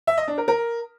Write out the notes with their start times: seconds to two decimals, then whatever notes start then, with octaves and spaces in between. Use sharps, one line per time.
0.07 E5
0.18 D#5
0.28 D4
0.38 A#4
0.48 A#4